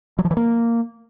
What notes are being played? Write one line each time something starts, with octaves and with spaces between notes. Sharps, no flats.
F#3
F3
E3
A#3